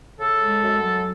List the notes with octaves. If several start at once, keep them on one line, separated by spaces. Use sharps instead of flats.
C#3 A4
G#3
F#2
F#3